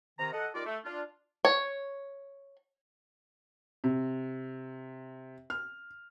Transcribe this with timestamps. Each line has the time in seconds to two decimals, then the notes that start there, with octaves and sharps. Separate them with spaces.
0.19 C3 D#3 A#5
0.33 A4 D#5 F#5
0.55 G3 D#4 F4 A#4 D5
0.66 A3
0.85 D4 F4
1.45 C#5
3.84 C3
5.50 F6